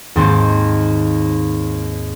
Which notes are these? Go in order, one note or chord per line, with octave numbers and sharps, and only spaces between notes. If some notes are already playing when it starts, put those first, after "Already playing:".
D#2 G#2 C4 A5 C6 G6